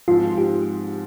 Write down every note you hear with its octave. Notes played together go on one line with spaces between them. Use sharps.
G#2 F3 G#3 C4 F4
G4